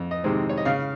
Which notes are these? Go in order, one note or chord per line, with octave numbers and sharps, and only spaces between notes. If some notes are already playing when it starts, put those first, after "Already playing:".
Already playing: F2
D#5
C3 D#3 G#3 C4
C#5
D#5
C#3 F5